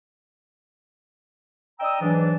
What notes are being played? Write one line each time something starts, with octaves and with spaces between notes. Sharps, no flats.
D5 D#5 G5 A#5 D#6 E6
G#2 E3 F#3 D4